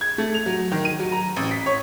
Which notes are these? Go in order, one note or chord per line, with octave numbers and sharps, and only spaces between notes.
G#6
A3
F7
F#3
D#3
D#7
F#3
A#5
A1
B6
C#5